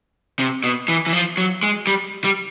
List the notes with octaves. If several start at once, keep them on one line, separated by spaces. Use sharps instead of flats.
C3
B2
E3
E3
F3
F#3
G#3
G3
G3